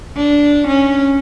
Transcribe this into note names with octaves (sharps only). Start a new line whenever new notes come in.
D4
C#4